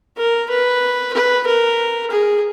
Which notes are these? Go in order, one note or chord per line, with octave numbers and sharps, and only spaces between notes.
A#4
B4
B4
A#4
G#4